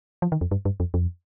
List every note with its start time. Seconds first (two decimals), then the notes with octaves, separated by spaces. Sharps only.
0.22 F3
0.32 D#3
0.41 F2
0.51 G2
0.65 G2
0.80 F2
0.94 F2